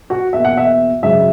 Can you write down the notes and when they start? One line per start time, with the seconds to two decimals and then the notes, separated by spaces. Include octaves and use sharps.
0.10 F#4 F#5
0.33 E2 B2 A#3 E5
0.45 F#5
0.57 E5
1.03 G#1 F#2 C#3 G#3 E5